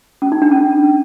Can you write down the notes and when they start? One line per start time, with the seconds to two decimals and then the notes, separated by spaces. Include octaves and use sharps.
0.22 C#4
0.32 D#4
0.42 D4
0.52 C#4